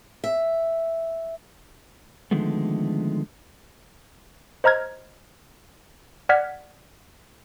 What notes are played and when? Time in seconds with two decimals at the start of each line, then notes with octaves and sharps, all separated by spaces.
0.24 E5
2.31 D3 D#3 F3 G#3 A3 B3
4.64 C5 D#5 A#5 F6 G#6
6.29 D5 F#5 F6 G#6 B6